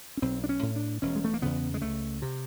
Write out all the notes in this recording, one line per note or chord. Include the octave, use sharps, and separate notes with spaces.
C#4
B1 C4
D4
C#4
A2
D4
E1 C#4
G#3
A3
A#3
E2 C#3 B3
G#3
C#2 A3
C3